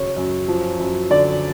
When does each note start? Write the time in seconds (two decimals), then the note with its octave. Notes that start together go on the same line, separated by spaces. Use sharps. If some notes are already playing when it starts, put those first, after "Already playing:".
Already playing: F#2 C#3 F#3 C#5
0.17 F#2
0.48 F3
0.79 F#2
1.11 D3 D5